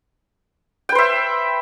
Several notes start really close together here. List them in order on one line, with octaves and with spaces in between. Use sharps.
G5 B4 C5 E5